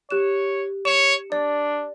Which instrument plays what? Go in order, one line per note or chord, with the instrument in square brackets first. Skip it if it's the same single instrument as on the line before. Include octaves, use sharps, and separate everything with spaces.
[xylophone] G4 F#6 E7 [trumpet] C#5
[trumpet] C#5 [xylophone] C#7 E7
[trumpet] D4 [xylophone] D5